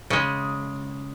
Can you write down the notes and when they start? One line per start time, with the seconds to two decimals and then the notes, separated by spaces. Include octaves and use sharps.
0.10 C#3 G#3